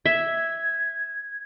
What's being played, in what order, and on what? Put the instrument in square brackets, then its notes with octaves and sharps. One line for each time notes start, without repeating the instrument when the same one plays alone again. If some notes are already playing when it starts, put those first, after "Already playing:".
[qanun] E5 [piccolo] G#6